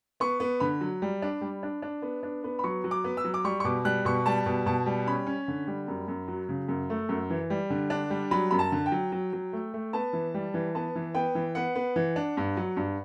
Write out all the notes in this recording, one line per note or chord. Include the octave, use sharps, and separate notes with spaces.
B3 C#6
B3
D3 B5
F#3
G3
D4
G3
D4
D4
B3
D4
B3
B5
F#3 C#6
F#3
D6
B3
E6
F#3
D6
G3 C#6
C#6
B2 D6
G3 F#6
B2 C#6
G3 A5
B2
B2 A5
G3
C#4 B5
C#4
D3
G3
F#2
F#2
F#3
C#3
F#2
A3
F#2
E3
G3
D3
D4
G3
F#3 B5
F#2 B5
A5
D3
G5
F#3
F#3
F#3
A3
A3
B3 A5
E3
G3
E3
B3 A5
E3
B3 G5
E3
B3 F#5
B3
E3
D4
G2
F#3
G2